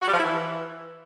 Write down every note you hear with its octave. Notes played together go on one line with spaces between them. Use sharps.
F#4
G3
F3
E4
E3